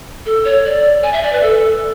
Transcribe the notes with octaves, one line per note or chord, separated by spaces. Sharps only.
A4
C#5
D5
G#5
E5
D5
B4
A4